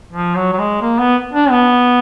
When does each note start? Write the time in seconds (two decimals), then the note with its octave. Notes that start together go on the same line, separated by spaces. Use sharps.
0.12 F3
0.35 F#3
0.53 F#3
0.59 G#3
0.81 A#3
0.98 B3
1.33 D4
1.50 B3